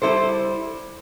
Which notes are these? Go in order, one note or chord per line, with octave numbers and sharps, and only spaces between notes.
G3 E4 A4 C5